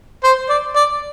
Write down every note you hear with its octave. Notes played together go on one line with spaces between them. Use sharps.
C5
D5
D5